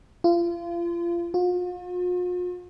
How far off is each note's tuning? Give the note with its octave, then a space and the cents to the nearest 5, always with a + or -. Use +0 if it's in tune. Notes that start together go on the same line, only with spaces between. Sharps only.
F4 -30
F4 +45